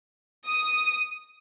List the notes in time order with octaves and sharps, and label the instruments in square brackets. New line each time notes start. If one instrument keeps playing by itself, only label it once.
[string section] D#6